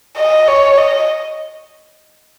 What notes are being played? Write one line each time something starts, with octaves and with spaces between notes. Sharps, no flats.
D#5
C#5
D#5